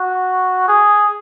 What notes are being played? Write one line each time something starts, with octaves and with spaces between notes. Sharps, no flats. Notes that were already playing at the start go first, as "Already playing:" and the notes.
Already playing: F#4
G#4